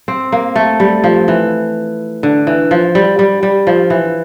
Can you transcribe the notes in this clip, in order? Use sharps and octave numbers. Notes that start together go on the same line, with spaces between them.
C4
A#3
A3
G3
F3
E3
D3
E3
F3
G3
G3
G3
F3
E3